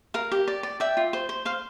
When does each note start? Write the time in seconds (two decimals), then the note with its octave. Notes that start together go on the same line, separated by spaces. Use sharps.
0.14 A#4 F5
0.32 G4
0.48 D5
0.63 D5
0.80 D5 E5 G5
0.97 F4
1.13 C5
1.29 C5
1.45 C5 F5